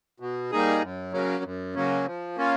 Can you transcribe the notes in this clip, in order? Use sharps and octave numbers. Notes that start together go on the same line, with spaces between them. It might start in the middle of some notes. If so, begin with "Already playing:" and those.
B2
G3 A#3 D#4 G#4
F#2
C#3 F#3 A#3 C#4
F#2
C#3 F#3 A#3 C#4
F3
A#3 C#4 F4